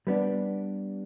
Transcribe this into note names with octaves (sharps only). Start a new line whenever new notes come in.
G3 B3 D4